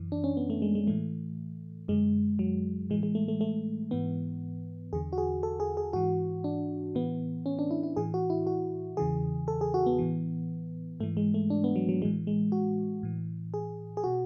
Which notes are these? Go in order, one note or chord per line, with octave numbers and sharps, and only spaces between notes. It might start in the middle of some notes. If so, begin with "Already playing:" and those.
Already playing: F#2 E3
D4
C#4
B3
A3
G#3
G#3
A2 E3 A3
F#2 D3 G#3
F#3
A2 E3 G#3
G#3
A3
A3
A3
G#2 E3 B3
E2 D3 G#4
F#4
G#4
A4
G#4
G#4
G#2 E3 F#4
D4
A2 E3 B3
C#4
D4
E4
E4
A2 E3 G#4
F#4
E4
F#4
E2 C#3 E3 G#4
A4
G#4
F#4
B3
A2 E3
G#2 E3 A3
G#3
A3
D4
B3
F#3
F#3
A2 E3 G#3
G#3
F#4
A2 E3
G#4
G#4
B2 F#4